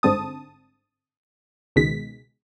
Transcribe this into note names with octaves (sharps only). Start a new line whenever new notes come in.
G1 G#2 D3 C4 A5 D#6
C#2 B2 D#3 G#3 B6